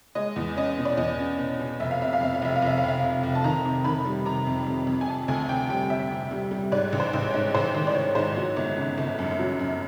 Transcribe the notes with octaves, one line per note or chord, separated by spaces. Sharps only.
G#3 D#5
E2
C#4 D#5
B2
D5
E2 D#5
C#4
B2
B2
F1 E5
F5
C3 E5
F5
F2 E5
F5
F1 E5
F5
F1 E5
F5
F1
E5
C3
F1
A5
D#3 A#5
C3
D#3 B5
G3
C3 A#5
F2
F2
F2
G#5
C3 A5
D2 G#5
C3 G5
G3 G5
C3 E5
C3
G3
G3
G#2 D5
A1
C5
A1
C#5
G#2
A1 C5
D#3
D5
D#3 C#5
G#2 C5
F#3 C#5
G1
C#3
G1
F#2
F#3
F#2